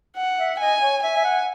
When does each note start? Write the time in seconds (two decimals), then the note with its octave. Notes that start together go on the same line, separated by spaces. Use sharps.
0.17 F#5
0.39 E5
0.60 D#5 G#5
0.82 C#5
1.03 E5 G#5
1.16 E5
1.24 F#5